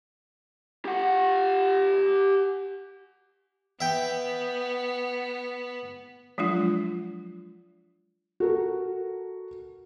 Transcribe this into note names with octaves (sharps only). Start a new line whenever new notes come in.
G4 F#5
B3 E5 G5
F3 F#3 G#3 D4 F4
F#4 A4 A#4